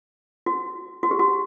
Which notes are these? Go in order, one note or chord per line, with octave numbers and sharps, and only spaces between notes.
F#4
F#4
G4
F#4